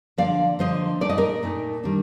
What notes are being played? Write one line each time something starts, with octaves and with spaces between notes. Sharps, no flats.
D3 F3 A#3 D4 D5 F5
D3 F3 A#3 D4 C5 D#5
A#2 A3 D#4 D5
D#5
A#4 D5
A#2 A3 D#4
D#3 G3 D4